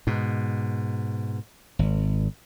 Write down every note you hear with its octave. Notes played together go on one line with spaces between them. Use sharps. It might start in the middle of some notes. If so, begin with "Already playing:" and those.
G#2 B2
G#1